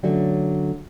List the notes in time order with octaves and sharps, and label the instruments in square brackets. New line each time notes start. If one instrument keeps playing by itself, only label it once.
[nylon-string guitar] D3 F#3 A3 C#4